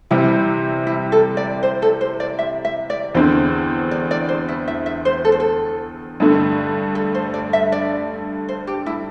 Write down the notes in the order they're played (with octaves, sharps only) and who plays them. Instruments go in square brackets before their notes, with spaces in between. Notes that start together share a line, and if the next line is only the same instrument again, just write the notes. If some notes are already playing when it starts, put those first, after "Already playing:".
[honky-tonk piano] C3 E3 G3 C4 [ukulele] E4
[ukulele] E4
A4
D5
C5
A4
C5
D5
E5
E5
D5
[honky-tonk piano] E2 D3 C4 [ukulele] C5
[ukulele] D5
D5
C5
E4
E5
E5
C5
A4
C5
A4
[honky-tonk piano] G2 D3 A3
[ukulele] A4
C5
D5
E5
D5
C5
G4
E4